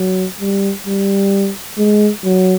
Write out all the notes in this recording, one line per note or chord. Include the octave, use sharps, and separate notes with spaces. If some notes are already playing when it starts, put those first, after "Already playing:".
Already playing: F#3
G3
G3
G#3
F#3